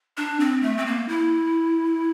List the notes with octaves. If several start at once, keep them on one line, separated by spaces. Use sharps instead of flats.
D4
C4
A3
C4
A#3
E4